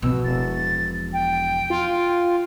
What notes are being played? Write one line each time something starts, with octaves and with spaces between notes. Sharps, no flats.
B2 F3 E6
E1 A6
G5
F4